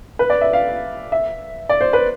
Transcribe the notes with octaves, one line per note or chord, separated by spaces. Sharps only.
B4
D5
E5
F5
E5
D5
C5
B4